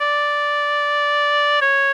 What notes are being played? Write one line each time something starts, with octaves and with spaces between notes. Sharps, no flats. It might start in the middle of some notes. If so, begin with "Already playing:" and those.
D5
C#5